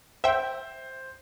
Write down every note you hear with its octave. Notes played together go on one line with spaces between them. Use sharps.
C5 E5 G5